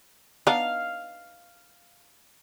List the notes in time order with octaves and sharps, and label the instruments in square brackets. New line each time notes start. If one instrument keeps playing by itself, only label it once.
[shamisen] B3 D4 D#4 [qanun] F5